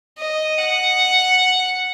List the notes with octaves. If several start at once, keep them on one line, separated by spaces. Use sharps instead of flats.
D#5
F#5